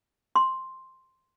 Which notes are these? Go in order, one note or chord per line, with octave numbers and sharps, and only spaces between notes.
C6